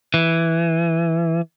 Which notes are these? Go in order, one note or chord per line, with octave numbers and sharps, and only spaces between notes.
E3